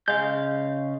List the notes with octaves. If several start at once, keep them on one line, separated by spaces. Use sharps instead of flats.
C#3 G#3 F5 G6